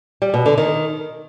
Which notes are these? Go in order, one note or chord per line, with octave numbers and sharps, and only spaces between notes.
G3
B2
D3
D#3